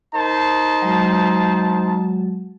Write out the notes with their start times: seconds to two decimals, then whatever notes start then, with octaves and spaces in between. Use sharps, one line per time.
0.14 D#4 A#4 C5 A5
0.82 F#3 G#3 F#4